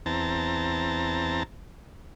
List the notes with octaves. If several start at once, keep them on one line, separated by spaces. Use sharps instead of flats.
E2 C4 A5 A#5